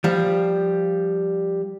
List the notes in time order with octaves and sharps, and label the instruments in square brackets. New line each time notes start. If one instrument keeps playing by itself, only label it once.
[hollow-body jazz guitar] F3 G3